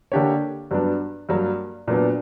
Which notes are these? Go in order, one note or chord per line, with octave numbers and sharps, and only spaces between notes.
D3 A#3 D4 G4 C#5
G2 F#3 B3 D4
G2 F#3 A#3
A#2 F#3 B3 D4